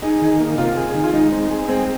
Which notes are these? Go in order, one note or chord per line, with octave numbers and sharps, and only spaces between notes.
D#4 G#4
D#3
A#3
C3 F4
G#4
D#3
F4
G#3 D#4
C4
G#4
G#3 C4